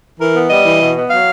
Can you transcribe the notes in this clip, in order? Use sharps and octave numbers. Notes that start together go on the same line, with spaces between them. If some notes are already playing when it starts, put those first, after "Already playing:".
E3 A#4
B3
G3 D#5
E3
B2
B3
F#3 F5